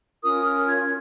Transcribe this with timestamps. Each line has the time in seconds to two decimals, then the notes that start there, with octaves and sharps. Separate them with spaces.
0.23 C#4 F4 A#4 D#6
0.46 F6
0.68 G#6